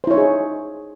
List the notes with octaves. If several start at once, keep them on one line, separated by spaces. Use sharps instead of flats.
D#4 E4 G#4 C5 C#5